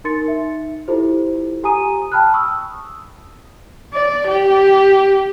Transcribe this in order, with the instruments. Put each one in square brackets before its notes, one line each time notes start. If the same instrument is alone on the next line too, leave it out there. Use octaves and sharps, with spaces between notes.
[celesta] D#4 A#4 C6 A6 C#7
D#4 E5
E4 F4 G4 A4 C5
G4 G#5 A#5 D#6 D#7
G5 A5 B5 F6 F#6
C#6 D#6 E6
[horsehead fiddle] D5
G4